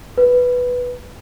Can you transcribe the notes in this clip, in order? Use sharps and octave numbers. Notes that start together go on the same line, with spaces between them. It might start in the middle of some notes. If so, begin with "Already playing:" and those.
B4